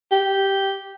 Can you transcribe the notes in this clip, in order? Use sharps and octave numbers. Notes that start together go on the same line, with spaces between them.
G4